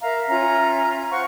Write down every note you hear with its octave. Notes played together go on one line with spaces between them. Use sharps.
A#4 E5 F5 A#5
C#4 F4 E5 A#5
C5 F5 F#5 C#6